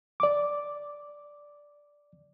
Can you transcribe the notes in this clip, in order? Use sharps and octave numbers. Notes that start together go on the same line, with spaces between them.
D5 D6